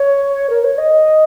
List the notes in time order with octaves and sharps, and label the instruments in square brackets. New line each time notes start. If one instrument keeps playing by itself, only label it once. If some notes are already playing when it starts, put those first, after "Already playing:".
Already playing: [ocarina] C#5
A#4
C#5
D#5